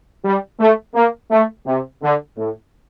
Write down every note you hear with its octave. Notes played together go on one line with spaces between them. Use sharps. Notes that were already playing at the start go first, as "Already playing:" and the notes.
G3
A3
A#3
A3
C3
D3
A2